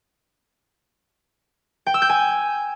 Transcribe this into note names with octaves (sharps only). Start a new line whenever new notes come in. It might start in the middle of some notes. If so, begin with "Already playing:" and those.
G5
E6
G6
G#5